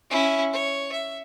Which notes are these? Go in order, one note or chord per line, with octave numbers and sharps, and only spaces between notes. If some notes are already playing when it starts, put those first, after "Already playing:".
C#4 E4
C#5
E5